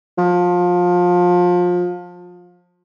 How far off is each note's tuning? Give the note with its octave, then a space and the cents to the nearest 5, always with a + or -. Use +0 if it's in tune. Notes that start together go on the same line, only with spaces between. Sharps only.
F3 +25